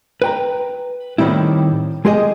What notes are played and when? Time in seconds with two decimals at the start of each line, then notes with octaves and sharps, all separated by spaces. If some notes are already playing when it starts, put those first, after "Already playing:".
0.22 B4 G5 A#5
1.18 A2 D#3 F3 G3 C4 E4
2.05 G#3 G4 G#4 D#5